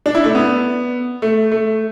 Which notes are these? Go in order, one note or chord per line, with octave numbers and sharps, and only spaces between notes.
D4
E4
A3 D4
B3
A3
A3